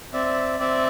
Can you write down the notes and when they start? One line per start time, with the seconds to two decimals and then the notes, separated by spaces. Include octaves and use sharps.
0.13 C4 D5 E5
0.59 C4 D5 E5